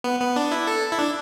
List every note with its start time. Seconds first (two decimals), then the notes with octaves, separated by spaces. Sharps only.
0.04 B3
0.20 B3
0.36 D4
0.52 E4
0.67 A4
0.92 E4
0.99 D4